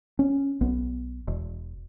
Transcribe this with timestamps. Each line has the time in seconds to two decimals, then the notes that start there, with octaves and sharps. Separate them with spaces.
0.19 C#4
0.61 B1 B3
1.28 E1